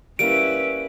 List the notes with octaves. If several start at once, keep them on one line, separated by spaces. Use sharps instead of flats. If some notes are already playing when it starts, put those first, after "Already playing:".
G3 A#3 C#4 E4 B4 D7